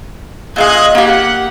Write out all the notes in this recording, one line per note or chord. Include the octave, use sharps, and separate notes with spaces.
A#2 G#3 D#5 F5 F#6 G#6
A#3 G4 F#5